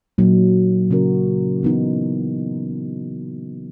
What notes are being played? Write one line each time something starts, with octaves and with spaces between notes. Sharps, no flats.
A#2 F#3 A#3 D#4
C#3 F#3 C#4 F#4 A#4
E3 B3 D#4